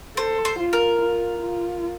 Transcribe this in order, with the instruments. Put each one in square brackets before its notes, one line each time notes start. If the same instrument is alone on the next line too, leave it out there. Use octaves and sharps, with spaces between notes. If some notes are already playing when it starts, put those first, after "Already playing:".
[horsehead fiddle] A4 [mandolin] C5
[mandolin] C5
[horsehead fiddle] F4
[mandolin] A#4
[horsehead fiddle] F4
F4